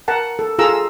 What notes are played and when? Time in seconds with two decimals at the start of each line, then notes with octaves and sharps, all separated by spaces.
0.08 A#4 F#5 A5
0.39 A4
0.59 F4 G#4 A4 A#5 E6